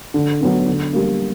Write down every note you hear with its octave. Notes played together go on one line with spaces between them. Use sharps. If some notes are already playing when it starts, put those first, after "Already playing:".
D3
F#3 B3 D4
D3
G3 A#3